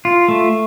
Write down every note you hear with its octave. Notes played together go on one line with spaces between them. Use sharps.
F4
A3